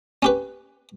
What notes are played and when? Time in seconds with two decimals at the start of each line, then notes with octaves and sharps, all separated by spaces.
0.23 C#4 G4 B4